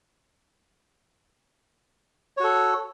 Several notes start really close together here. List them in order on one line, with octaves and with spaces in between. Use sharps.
C#5 F#4 A4